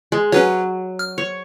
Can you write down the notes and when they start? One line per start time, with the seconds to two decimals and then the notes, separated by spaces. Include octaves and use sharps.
0.12 G#3
0.32 F#3 C#4 B4 C#5
0.99 F6
1.18 C#5